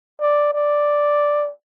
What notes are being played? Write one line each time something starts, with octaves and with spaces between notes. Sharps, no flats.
D5
D5